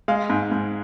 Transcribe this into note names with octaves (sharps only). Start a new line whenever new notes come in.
G#3 F5
G#2
G#2